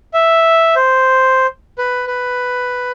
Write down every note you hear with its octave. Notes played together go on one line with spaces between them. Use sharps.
E5
C5
B4
B4